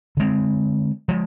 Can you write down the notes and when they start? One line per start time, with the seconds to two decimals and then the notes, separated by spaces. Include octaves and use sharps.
0.17 D3 G#3 C4
1.08 F3 G#3